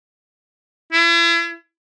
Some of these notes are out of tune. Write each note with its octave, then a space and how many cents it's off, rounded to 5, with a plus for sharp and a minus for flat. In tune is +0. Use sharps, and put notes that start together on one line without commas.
E4 +40